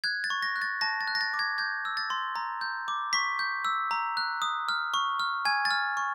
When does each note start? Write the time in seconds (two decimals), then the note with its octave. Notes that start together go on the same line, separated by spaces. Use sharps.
0.04 F#6 G#6
0.24 A6
0.30 C#6
0.42 A#6
0.56 F#6
0.62 A6
0.81 A5 A#6
1.01 A6
1.08 F#6
1.15 A#6
1.21 A6
1.34 D6
1.39 G#6
1.58 G6 G#6
1.85 E6
1.97 A6
2.10 C6
2.36 A#5
2.61 G6
2.88 D6
3.13 C#6 B6
3.39 G6
3.65 E6
3.91 A#5
4.17 F#6
4.42 D#6
4.69 F6
4.94 C#6
5.19 F6
5.45 G#5 G#6
5.65 A6
5.71 F6
5.97 C#6